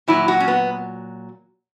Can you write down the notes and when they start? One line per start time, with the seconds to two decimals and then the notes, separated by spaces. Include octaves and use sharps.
0.08 A#2 F#3 E4
0.28 F#4
0.40 C#4
0.48 B3